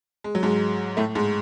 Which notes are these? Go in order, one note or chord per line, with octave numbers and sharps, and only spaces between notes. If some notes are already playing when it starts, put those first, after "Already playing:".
G#3
F#3
G#2 G#3
A2 A3
G#2 G#3